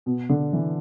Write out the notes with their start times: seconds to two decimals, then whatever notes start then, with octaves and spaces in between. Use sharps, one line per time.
0.06 B2
0.29 D3
0.53 E3